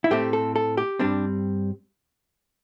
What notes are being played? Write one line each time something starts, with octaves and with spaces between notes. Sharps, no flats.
E4
A2 A3 C4 G4
A4
A4
G4
G2 G3 C4 D4